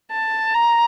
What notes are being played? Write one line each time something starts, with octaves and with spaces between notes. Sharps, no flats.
A5
A#5